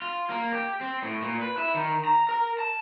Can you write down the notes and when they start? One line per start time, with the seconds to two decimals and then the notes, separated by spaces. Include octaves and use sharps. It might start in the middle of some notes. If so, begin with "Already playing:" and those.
0.02 F4
0.30 A#3
0.52 G4
0.81 C4
1.03 A2
1.22 A#2
1.41 B4
1.57 E4
1.74 D#3
2.05 A#5
2.29 A#4
2.59 A5